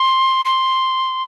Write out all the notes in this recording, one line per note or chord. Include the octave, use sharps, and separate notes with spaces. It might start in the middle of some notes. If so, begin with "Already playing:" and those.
Already playing: C6
C6